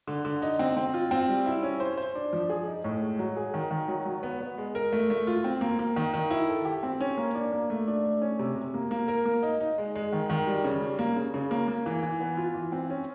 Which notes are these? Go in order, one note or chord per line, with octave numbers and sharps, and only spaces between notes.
D3
D3
D#4
C4
C4
F4
C4
G3
E4
C#4
C5
C5
D4
F3
G#4
D#4
A2
G#3
F#3
G#4
D#3
D#3
F#3
F#3
B3
B3
G#3
A#4
A3
A3
F4
C4
A#3
A#3
D#3
D#3
E4
A4
G4
C4
C#4
A#3
D4
A#3
A3
D4
A3
C#4
C3
C3
A#3
A#3
A#4
A#3
D#4
D#4
G#3
G#3
D#3
D#3
G3
C#3
G3
A#3
C#3
C#3
A#3
A#3
E3
E3
B3
F4
E3
C4
C#4